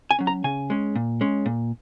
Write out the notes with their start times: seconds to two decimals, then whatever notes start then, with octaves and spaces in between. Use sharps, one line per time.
0.11 G#5
0.19 F#3 C#4
0.27 A#5
0.44 C#3 G#5
0.70 G#3 C#4
0.95 A#2
1.21 G#3 C#4
1.46 A#2